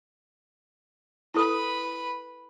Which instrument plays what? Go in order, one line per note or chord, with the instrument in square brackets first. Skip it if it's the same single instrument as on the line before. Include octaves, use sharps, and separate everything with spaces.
[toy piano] E4 A4 D#6 [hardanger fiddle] B4 B5